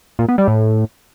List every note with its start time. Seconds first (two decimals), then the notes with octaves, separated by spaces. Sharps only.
0.19 A#2
0.28 B3
0.38 G3
0.48 A2